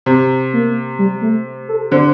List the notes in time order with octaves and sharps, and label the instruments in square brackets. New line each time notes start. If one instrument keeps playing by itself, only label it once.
[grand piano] C3
[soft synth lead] A#3
G3
A3
A4
[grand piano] D3 [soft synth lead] C5